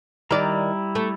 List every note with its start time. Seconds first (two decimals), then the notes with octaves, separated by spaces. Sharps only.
0.31 D#3 G3 E4 D5 A#5
0.95 A3